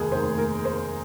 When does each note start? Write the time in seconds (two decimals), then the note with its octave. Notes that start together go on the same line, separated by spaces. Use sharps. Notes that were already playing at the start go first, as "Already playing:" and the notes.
Already playing: F1 D#2 D#3 G#4
0.12 F1 D#2 D#3 A#3 C5
0.38 A#4
0.65 C5